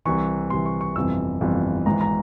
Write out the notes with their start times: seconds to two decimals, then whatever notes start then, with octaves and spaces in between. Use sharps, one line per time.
0.05 C2 C3 E3 C#6
0.50 C2 C3 E3 C6
0.66 C#6
0.81 C#6
0.96 G1 F2 C3 E3 E6
1.41 G1 F2 C3 E3
1.86 G#1 G#2 E3 A#5
2.01 A#5